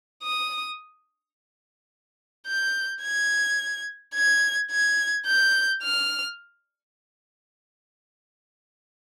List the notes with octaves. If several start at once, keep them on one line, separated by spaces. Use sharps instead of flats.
D#6
G6
G#6
G#6
G#6
G6
F6